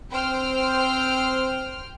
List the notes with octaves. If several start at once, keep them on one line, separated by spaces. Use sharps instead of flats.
C4 C5 G5 F6